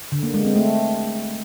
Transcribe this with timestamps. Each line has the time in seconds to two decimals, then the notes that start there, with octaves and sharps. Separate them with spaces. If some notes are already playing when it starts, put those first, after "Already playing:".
0.12 D3
0.23 A#3
0.34 G#3
0.45 C4
0.56 A3